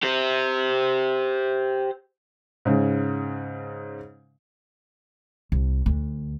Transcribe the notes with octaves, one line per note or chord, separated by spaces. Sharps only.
G4 C5
G#2 C#3
C2
D2